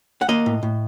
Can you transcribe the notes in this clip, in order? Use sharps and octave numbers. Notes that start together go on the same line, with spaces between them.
F#5
A#3 D#5
A2
A2